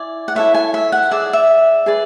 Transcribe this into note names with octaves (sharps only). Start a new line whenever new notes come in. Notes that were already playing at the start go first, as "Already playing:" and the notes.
Already playing: E4 D5 G#5
F#5
E4 A4 C#5 E5
G#5
E5
F#5
G#4 D5 E5
E5
G#4 B4 D5